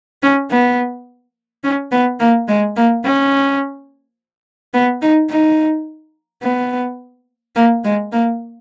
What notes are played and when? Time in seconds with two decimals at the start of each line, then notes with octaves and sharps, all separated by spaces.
0.23 C#4
0.51 B3
1.64 C#4
1.92 B3
2.20 A#3
2.48 G#3
2.77 A#3
3.05 C#4
4.74 B3
5.02 D#4
5.30 D#4
6.43 B3
7.56 A#3
7.84 G#3
8.12 A#3